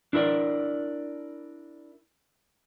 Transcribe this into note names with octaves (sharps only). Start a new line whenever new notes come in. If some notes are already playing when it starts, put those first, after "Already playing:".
D4 E4 A#4 D5